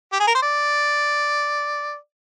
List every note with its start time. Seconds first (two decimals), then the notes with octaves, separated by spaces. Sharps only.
0.13 G4
0.20 G#4
0.27 A#4
0.35 C5
0.43 D5